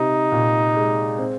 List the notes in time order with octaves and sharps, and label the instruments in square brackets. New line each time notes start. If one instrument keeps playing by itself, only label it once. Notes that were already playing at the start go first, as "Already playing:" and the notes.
Already playing: [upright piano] C3 C4 [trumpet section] D#4
[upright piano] A#2
G#3
C4